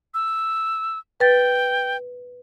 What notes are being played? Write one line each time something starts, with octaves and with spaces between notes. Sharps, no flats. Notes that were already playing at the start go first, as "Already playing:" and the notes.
E6
B4 G5 A6